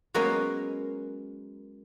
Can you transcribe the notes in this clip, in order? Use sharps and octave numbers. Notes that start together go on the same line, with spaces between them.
F#3 G#3 A#3 B3 C#4 A#4